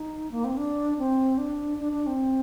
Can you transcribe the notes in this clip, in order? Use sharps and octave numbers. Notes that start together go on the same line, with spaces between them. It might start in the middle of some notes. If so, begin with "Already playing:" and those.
Already playing: D#4
A#3
C4
D4
C4
D4
D4
D4
C4